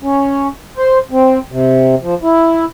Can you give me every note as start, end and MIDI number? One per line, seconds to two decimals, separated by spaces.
0.02 0.48 61
0.77 0.98 72
1.11 1.38 60
1.52 1.95 48
2.02 2.15 53
2.23 2.65 64